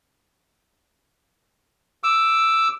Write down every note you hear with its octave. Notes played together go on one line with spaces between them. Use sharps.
D6 E6